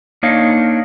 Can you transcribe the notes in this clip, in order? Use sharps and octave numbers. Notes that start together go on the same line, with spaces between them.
A#3 D4 D#4 C#5 D#5 F5